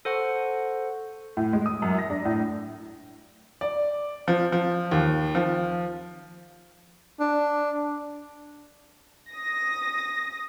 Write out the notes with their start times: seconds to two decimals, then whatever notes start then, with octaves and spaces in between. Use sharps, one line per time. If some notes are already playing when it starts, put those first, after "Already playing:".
0.05 A4 C5 F#5 C#6
1.37 A2
1.53 G#3
1.66 D#6
1.82 F#2
1.99 A#6
2.10 D4
2.25 A2
3.61 D5
4.28 F3
4.52 F3
4.91 D#2
5.35 F3
7.20 D4
9.31 D#6 A#6